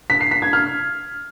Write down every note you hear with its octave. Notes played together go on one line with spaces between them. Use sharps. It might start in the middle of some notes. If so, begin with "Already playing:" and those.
B6
C7
B6
G#6
F6